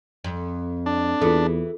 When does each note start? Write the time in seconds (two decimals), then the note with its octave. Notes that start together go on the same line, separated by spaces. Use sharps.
0.24 F2
0.86 D4
1.22 E2 E3 F4 G#4 A4